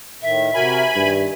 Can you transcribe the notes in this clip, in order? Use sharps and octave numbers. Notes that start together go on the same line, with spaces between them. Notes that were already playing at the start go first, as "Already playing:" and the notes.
A2 D#3 E5
C3 F#4 A#4 G#5 B5
G2 D#3